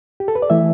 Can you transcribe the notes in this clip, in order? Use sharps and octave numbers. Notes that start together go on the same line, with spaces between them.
G4
A4
B4
D5
E3 A3 E4 E5